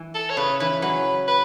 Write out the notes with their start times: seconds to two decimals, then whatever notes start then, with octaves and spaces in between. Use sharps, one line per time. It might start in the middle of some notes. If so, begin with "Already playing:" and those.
Already playing: E3
0.14 A4
0.30 C#5
0.37 C#3 B4
0.60 E3 B4
0.82 F#3 B4
1.28 B4